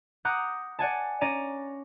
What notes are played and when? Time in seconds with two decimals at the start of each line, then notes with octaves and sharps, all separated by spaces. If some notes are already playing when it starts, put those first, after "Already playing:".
0.25 F#5 A#5 D6 D#6 F#6 G6
0.79 D5 F#5 G#5 A5
1.21 C#4 D5 A#5 A#6 D#7